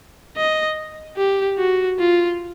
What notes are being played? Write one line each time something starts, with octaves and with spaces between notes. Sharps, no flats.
D#5
G4
F#4
F4